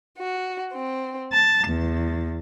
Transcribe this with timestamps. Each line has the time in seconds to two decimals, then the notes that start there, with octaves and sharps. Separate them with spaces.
0.19 F#4
0.74 C4
1.33 A5
1.67 E2